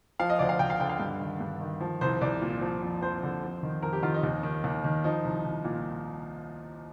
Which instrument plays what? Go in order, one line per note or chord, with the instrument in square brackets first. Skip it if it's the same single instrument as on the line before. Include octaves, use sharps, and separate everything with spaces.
[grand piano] F3 F5
D#5
D2 D5
F5
D2 G5
F5
D3 G5
F5
G2
D#3
G2
D#3
F3
C2 C5
C2 D5
A#2
F3
F2
F2 C5
D3
F2
D#3
F2 A#4
G4
D#3 F4
D#4
D#2
D#3
D#2
D#3
F3 D#4
C2
C2
A#2